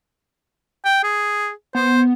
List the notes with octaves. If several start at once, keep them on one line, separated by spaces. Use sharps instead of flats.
G5
G#4
B3 C5